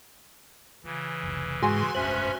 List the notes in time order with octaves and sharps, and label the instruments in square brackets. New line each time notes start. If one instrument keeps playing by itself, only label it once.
[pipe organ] C#3 E3 [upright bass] F4
[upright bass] F1 C2
[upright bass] A1 [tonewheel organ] G#2 G#3 [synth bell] F#4 G#5 C6
[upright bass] F1 A#1 [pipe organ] G2 C#4 E5 [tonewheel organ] C5 F#6